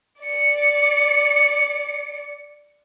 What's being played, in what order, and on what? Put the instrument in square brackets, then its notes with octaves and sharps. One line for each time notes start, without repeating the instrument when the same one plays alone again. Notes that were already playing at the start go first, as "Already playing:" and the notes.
[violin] D5 C#7